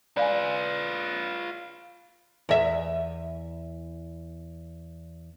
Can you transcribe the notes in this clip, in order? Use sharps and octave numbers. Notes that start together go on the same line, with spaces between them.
F4 B4 D5 F5 G#5
E2 E5